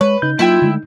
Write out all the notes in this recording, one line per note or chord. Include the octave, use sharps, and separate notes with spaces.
G#3 B4 C#5
C#3 D#4 G6
F#3 A#3 E4 F4 E5 G5
D3 G#3 A3